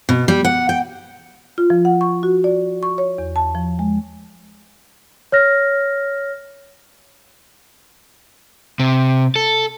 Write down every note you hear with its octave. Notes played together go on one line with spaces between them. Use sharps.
B2
G3
F#5
G5
F4
F3
F#5
C#6
F#4
D5
C#6
C#5
E2
A5
F3
G#3
C#5 F6 A#6
C3
A4